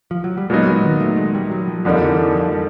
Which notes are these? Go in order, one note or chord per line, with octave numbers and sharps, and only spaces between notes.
F3
F#3
G3
A#2 F#3 G#3 B3 D#4
G#3
D#3
A3
G#3
G3
F#3
F3
F2 D3 F3 G3 A#3 D#4
E3
E3
F3
G3